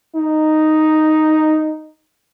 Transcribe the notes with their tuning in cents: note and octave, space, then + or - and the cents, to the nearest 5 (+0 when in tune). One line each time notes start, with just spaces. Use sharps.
D#4 +0